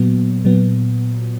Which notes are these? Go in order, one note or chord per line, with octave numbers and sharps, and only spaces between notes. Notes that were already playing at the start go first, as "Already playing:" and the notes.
Already playing: A#2 F#3 B3
A#2 F#3 B3